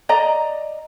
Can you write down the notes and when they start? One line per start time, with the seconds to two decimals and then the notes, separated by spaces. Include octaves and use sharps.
0.09 D5 D#5 A#5